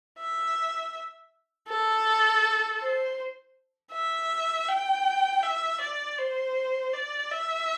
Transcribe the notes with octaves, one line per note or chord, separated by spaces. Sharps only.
E5
A4
C5
E5
G5
E5
D5
C5
D5
E5